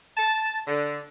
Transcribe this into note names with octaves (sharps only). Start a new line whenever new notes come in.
A5
D3